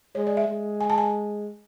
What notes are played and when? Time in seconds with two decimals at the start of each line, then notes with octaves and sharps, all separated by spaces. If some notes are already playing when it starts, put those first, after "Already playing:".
0.15 G#3 C#5
0.27 D5
0.37 E5
0.48 G#3
0.81 G#5
0.90 A5
0.98 G#5